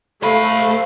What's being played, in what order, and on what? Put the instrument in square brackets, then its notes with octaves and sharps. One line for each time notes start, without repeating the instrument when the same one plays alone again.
[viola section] A3 [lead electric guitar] C5 B5 [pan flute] F5